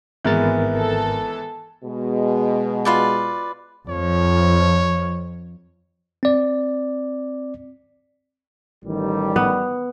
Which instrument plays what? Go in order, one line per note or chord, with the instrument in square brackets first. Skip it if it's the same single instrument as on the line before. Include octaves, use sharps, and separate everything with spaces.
[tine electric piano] G#1 A#4 A6 [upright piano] E3 G#3 B3
[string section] A4
[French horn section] B2 G#3
[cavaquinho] F4 B4 D5
[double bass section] F2 F3 [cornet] C#5
[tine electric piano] C4 D5
[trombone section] A1 D#3 G3
[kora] B3